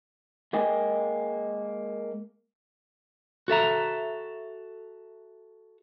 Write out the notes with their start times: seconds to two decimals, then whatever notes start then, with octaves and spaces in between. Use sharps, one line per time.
0.53 G#3 A#3 D#5 G5 G#5
3.48 F#4 A4 E5 A#5